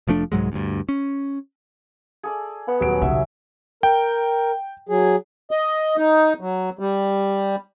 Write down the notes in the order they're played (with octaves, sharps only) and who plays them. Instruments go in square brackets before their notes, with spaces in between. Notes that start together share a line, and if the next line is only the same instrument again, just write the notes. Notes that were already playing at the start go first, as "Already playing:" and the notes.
[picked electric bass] F1 F3 A3 D4
C2 G#2 F#3 G#3
D2 G2
C#4
[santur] G#4 A4 D5
[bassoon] B3 [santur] F#5
[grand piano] D#1 F#3 D7 [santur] G#4
[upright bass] B1 C#3 [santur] E5
[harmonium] A#4 [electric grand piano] G5
[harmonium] F#3 G#4
[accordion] D#5
D#4
F#3
G3